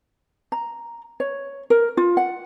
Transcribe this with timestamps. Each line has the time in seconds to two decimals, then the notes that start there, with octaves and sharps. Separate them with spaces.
0.52 A#5
1.20 C#5
1.70 A#4
1.97 F4
2.17 F#5